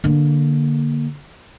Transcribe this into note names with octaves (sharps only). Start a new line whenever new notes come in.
D3 A#3